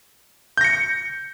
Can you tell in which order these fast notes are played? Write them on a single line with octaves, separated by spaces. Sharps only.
G6 A#6 C#7